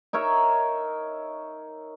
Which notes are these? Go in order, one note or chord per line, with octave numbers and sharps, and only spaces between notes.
D#4 A#4 C#5 E5